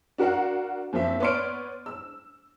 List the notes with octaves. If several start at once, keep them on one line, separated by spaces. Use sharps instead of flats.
D4 F#4 A#4 F5 F#5
F#1 F3 A#3 C4 E5
B3 C#5 D5 C6 F6 D7
E6